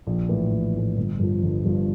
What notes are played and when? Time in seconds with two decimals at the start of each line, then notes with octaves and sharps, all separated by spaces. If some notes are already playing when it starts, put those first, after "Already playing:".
0.07 A#1
0.29 A2 E3
0.52 A#1
0.75 A2 E3
0.97 G1
1.19 G2 F3
1.43 G1
1.65 G2 F3